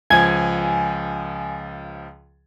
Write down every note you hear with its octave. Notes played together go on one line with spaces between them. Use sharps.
C#2 F3 G#5 G#6